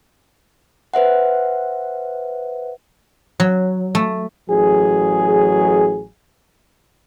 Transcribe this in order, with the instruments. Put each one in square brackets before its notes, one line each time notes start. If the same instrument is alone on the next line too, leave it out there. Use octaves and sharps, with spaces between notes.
[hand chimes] B4 C5 E5 F#5
[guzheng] F#3
A3
[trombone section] A1 F#3 G#4